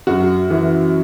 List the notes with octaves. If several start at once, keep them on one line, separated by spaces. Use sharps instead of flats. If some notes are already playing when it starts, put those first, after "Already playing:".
F#2 F#4
E3